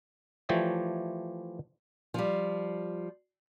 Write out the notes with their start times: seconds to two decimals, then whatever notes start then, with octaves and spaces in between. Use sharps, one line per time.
0.49 E3 F3 A3 G4 C#5 D5
2.14 F3 G3